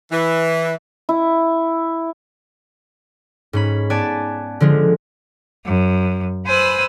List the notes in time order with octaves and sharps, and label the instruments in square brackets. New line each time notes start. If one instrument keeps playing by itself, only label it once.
[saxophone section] E3
[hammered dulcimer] E4
[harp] G#2 C#4 B5
B3 D5 G#5 A5
D3 F3 G#3
[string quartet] F#2
B4 C5 G#5 B5 E6 F#6